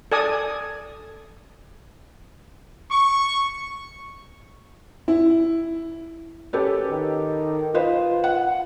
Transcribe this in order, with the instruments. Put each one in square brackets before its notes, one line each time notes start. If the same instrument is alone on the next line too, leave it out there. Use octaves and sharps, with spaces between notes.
[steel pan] A4 D5 G#5 D#6
[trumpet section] C#6
[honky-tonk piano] E4
[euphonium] C#4 [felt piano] G4 A4 B4
[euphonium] D#3
[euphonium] F4 [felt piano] B4 C5 D#5
[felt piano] F#5